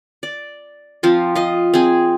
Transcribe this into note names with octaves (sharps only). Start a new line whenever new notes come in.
D5
F3 C4 F4
F4 D#5
C4 G#4